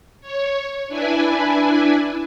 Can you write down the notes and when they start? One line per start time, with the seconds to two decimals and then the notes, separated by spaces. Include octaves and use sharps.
0.21 C#5
0.88 D4 E4 B4 G#5